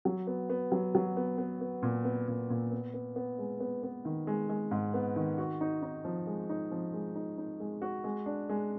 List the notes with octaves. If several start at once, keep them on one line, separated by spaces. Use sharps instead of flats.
F#3
B3
B3
F#3
F#3
B3
B3
B3
A#2
B3
A#2
A#2
B3
B3
B3
G#3
B3
B3
D#3
G#3
G#3
G#2
B3
D#3
F#4
D#4
D#4
F3
G#3
D#4
F3
G#3
D#4
D#4
G#3
F#4
G#3
D4
G#3